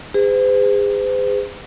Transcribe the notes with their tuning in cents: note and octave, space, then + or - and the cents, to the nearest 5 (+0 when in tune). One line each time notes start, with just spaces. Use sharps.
G#4 -35 C5 -45